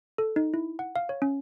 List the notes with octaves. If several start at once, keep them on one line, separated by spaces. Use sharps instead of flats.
A4
D#4
E4
F#5
F5
C#5
C#4